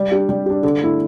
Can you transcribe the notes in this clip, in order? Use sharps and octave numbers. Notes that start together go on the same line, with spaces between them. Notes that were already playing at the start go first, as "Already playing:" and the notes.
Already playing: G3
D4 G4
G3
D4 G4
D3
A3 E4